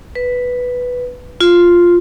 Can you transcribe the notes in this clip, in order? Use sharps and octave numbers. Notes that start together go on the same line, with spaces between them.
B4
F4